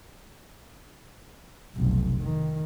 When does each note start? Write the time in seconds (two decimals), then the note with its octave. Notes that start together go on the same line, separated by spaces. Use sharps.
1.76 F1 B1
2.22 D#3